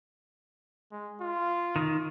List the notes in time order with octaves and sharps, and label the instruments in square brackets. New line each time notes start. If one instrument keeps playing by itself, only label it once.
[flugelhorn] G#3
F4
[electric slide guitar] D#3